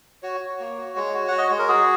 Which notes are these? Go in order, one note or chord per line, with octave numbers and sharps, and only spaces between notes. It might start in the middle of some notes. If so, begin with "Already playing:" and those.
F#4 C#5
F#4
A#3
F#4
G#3 C#5
F#4
F#4 F#5
D#5
G#3 C#5
A#4
F#4 G#4